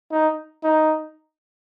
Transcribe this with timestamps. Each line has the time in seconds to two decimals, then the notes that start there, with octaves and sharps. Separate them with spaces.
0.12 D#4
0.64 D#4